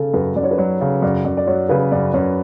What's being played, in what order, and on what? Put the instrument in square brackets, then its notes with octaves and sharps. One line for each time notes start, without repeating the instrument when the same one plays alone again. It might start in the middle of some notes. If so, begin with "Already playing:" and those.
Already playing: [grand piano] C#3 [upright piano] A4
[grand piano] F#2 [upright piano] B4
[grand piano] F#2 [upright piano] D5
[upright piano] C#5
B4
[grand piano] F#3 [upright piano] C#5
[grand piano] C#3
[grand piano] F#2 [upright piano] D5
[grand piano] F#2 [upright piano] D5
[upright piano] D5
[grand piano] F#3 [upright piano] C#5
[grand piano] C#3 [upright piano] B4
[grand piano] F#2 [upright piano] D5
[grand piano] F#2 [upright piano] C#5